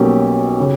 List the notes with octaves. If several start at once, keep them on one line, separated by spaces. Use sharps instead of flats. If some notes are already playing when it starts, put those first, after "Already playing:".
Already playing: B1 B2 G3 A#3 C#4 G4
C#3